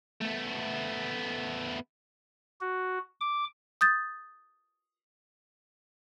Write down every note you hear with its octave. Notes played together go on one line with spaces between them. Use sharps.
A3 B3
F#4
D6
D#6 G6 A6